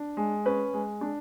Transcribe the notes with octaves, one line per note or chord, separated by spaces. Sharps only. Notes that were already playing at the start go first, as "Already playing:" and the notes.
Already playing: D4
G#3
C#4 B4
G#3
D4